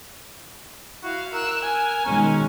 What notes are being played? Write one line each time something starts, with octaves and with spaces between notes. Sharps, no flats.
E4 F#4 F5
A#4 E6 F#6
G#5
B2 D#3 G#3 C#4